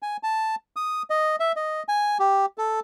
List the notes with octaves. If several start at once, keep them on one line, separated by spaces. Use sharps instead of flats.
G#5
A5
D#6
D#5
E5
D#5
G#5
G4
A4